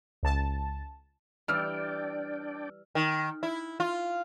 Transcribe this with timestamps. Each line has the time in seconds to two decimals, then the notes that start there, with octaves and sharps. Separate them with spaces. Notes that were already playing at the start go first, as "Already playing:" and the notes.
0.23 C#2 A5
1.48 E3 G3 D4 D5 G5 E6 F6
2.95 D#3
3.43 E4
3.80 F4